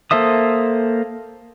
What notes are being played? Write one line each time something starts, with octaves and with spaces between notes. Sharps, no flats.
A#3 A4 C5 E5 D#6